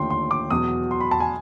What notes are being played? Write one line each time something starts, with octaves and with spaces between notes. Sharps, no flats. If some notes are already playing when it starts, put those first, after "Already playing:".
Already playing: D#2 D3 F3 A3 G5 C6
C6
D6
E2 B2 F#3 D#6
C6
B5
A5
G#5